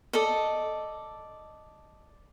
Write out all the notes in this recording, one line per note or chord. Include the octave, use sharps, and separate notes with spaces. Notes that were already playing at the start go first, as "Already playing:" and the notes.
A4 D5 D#5